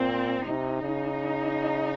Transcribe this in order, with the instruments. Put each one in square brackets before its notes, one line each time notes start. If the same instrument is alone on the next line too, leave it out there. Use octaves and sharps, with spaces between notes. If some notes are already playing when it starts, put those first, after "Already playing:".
Already playing: [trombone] A#2 [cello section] C4
[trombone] C3 [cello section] D#4
[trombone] C#3